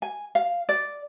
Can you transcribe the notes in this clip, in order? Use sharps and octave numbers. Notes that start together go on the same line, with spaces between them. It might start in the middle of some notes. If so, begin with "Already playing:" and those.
G#5
F5
D5